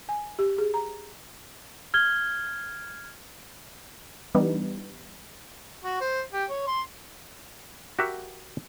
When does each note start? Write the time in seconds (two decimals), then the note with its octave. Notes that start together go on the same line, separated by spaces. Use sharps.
0.09 G#5
0.39 G4
0.58 G#4
0.74 A#5
1.94 F6 G#6 G7
4.35 E3 G3 B3 D4 D#4
5.84 F#4
6.01 C5
6.33 G4
6.50 C#5
6.67 C6
7.99 F#4 G4 A#4 E5 F#5